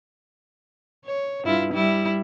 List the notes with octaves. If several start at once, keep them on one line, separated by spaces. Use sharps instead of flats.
C#5
G2 E4 F4
G3 E4